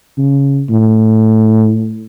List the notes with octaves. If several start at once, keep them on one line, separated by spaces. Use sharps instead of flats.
C#3
A2